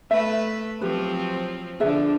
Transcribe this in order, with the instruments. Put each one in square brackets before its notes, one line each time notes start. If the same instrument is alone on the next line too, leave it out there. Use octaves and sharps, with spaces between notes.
[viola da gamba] A3 B4 [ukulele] E5
[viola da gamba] F3 F#3 C4 [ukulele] G4 B4
[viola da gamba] D3 F3 D4 [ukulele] G#4 B4 E5